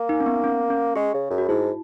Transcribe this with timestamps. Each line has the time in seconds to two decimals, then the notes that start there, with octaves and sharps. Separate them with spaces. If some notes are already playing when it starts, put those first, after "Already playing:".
Already playing: A#3
0.09 D#4
0.20 C#4
0.26 B3
0.44 C#4
0.70 C#4
0.96 G#3 G#4
1.14 C#3
1.30 F#2
1.38 F#4
1.48 G#2 E4